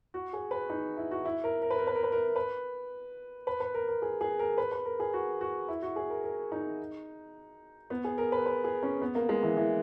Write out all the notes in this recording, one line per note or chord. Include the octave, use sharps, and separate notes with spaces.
F#4
G#4
B4
D#4
E4
F#4
E4
A#4
A#4
B4
A#4
B4
A#4
B4
A#4
B4
B4
B4
A#4
A#4
G#4
G#4
A#4
B4
B4
A#4
G#4
F#4
F#4
E4
F#4
G#4
A#4
A#4
D#4
B3
G#4
A#4
B4
B4
G#4
C#4
B3
A#3
G#3
E3
E3